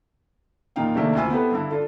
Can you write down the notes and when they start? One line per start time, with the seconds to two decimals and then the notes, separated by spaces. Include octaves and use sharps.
0.76 E1 A#2 D#4 F5 G5
0.95 C3 D#3 A3 A#3 D4
1.15 D2 E4 F4 G#5 E6
1.30 B3 C4 E4 G4 A4 B4
1.52 G2 D3 E4
1.71 D4 F4 A4